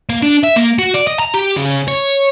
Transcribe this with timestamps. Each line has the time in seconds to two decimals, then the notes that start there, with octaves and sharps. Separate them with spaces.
0.09 A#3
0.22 D4
0.44 E5
0.56 A#3
0.79 F#4
0.94 D5
1.07 D#5
1.20 A#5
1.34 G4
1.57 C#3
1.88 C#5